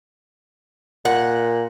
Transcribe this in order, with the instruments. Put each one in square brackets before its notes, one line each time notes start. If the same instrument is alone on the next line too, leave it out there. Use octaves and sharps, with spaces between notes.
[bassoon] A#2 [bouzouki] F#5